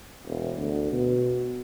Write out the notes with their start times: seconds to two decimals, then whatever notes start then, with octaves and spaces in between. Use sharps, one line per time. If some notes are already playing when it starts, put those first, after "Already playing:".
0.25 E1
0.57 D2
0.92 B2